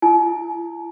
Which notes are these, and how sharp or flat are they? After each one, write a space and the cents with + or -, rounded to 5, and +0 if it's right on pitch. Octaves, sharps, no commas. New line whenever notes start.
E4 +40 G#5 +45